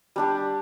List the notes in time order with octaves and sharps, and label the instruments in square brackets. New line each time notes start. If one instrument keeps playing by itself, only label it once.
[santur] G3 D4 G4